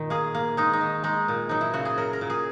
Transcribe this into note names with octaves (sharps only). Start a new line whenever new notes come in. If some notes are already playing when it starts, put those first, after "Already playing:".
Already playing: A#2 D#3
A#3 G#4
A#3
G#3 D#4
D#4
D#3
G#3 D#4
A#2
F#3 D#4
E4
C#3 F#4
G#4
F#3 A#4
A#4
A#2
G#4